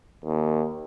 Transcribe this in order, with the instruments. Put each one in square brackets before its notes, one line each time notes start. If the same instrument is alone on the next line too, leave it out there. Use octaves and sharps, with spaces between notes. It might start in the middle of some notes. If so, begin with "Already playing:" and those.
[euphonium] D#2